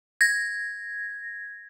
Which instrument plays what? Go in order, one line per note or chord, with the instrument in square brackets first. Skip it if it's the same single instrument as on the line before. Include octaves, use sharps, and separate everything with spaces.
[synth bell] G#6 A#6